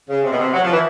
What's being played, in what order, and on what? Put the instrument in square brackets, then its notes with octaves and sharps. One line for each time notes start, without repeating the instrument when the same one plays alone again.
[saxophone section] C#3
C3
B2
C3
F#3
F3
E3